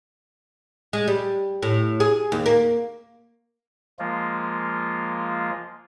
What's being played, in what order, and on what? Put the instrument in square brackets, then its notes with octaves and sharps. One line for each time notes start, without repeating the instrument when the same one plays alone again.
[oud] G#3
G3
A2
G#4
D#2
A#3
[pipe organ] F3 G#3 A#3 F4